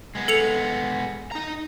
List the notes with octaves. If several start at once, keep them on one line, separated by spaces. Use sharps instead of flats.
G#3 B3
A4 C#7 F7
D#4 A#5